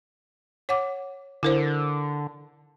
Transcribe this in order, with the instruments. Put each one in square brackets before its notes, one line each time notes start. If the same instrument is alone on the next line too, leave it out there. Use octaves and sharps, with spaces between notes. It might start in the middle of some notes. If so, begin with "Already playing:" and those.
[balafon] C#5 F#5 D6
[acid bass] D3 [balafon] E4 A#4 C5